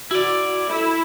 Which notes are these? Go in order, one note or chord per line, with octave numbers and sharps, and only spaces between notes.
E4 F#4 D5
E4 A4